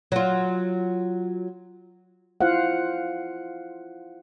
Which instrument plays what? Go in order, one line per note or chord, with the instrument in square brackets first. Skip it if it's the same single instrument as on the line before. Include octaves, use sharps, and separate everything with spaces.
[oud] F#3 F4
[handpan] E4 F4 C5 F5 F#5